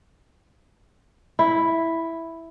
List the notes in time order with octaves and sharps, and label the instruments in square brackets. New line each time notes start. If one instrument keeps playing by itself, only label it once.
[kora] E4